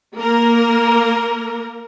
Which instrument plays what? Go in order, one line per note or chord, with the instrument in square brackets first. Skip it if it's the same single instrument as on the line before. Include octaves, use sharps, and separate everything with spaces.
[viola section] A#3 A#4